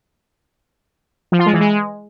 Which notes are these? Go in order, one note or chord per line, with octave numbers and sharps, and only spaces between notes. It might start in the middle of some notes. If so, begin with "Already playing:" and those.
F3
F4
G#3
E3
G#3